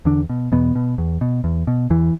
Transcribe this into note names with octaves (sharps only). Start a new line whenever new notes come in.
E2 D3 D4
B2
E2 B2 B3
B2
E2
B2
E2
B2
E2 E3